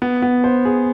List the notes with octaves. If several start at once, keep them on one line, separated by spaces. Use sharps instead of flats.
B3
B3
C5
G#4